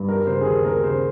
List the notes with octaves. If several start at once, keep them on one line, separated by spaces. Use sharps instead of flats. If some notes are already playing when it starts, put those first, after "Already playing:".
Already playing: G2
G3 A#4
C#3 C5
G#4
D#2 A#4
A#3 A#4
C#3 C5